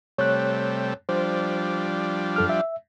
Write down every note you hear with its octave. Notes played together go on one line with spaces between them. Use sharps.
C3 G3 A3 C#5 F#6
F3 G3 D4 C5
F#2 A4 F6
E5